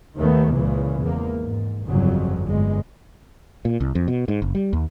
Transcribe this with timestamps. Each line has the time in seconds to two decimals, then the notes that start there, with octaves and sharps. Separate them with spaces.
0.18 D#2 D#3 A3 B3
0.55 C#2 A#2 C#3 E3
1.01 G#1 E2 A#3
1.41 G#2
1.87 G1 F2 C#3 F#3
2.45 G1 G#3
3.65 A#2
3.80 C2
3.95 F2
4.08 B2
4.28 G#2
4.42 F#1
4.55 G3
4.73 D#2